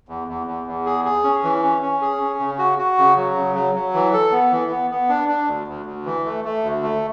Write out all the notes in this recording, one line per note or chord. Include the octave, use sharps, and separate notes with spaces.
E2
E2
E2
E2
G#4
G#4
C#4
E3
C#4
C#4
G#4
C#4
C#3
F#4
F#4
C#3
F#3
C#3
F#3
F#3
E3
A4
B3
E3
B3
B3
D4
D4
D2
D2
D2
E3
A3
A3
D2
A3